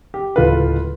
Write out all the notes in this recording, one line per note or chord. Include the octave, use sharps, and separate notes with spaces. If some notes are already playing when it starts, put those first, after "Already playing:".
G4
D1 C#2 F4 A4 B4